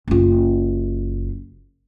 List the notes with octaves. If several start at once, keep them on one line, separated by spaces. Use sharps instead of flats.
F#1 F4